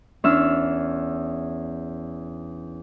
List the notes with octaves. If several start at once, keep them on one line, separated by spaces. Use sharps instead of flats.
E2 C#4 D4 E5 E6 F6